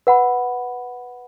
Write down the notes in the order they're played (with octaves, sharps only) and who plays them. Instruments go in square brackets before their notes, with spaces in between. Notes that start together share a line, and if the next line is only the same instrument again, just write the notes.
[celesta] B4 F#5 B5